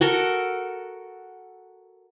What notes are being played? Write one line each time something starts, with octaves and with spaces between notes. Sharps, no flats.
F#4 A4 A#4